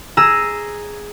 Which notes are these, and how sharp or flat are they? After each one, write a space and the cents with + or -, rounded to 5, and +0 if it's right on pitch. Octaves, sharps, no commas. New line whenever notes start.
G#4 +0 A#5 +0 E6 +0